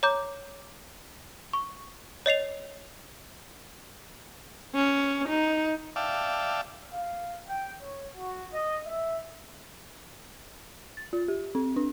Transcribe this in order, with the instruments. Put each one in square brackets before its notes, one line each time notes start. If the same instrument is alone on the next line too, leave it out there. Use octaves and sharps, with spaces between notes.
[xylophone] C#5 A#5 D6 G6
C#6
C#5 D#5 C7 F7
[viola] C#4
D#4
[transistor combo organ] D5 E5 F5 G5 A5
[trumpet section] F5
G5
C#5
F#4
D#5
E5
[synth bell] A6
F4
G4
C4
D4